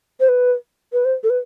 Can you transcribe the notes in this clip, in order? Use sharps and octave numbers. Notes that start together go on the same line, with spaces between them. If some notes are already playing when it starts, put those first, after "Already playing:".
C5
B4
B4
C5
A4
B4